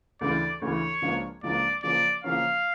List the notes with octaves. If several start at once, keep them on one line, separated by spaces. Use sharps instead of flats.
D2 C#3 E3 D5
D2 C#3 E3 C#5
C#2 C#3 F3 A#3 D4
C#2 C#3 F3 A#3 D4 D5
C#3 F3 A#3 C#4 D5
C#3 F3 A#3 C#4 F5